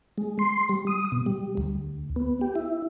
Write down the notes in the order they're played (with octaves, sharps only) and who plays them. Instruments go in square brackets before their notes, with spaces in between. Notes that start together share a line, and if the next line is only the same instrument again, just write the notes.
[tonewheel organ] G#3
C6
G3
D#6
B2
G3
D2
B3
G4
E4